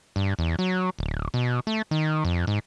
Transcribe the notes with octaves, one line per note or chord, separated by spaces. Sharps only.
G2
E2
F#3
D1
B2
A3
D#3
F2
G#2